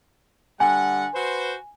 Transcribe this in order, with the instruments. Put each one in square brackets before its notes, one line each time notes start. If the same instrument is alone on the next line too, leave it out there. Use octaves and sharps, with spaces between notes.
[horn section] D3 G3 F#5 [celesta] G#5
[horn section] F#4 B4 C5